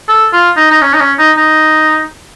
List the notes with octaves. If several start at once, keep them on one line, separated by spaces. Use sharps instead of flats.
A4
F4
D#4
D#4
C#4
D#4
C#4
D#4
D#4